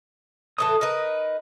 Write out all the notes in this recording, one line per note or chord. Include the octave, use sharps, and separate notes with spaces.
A2 E3 A4 D#6
D#4 A#4 B4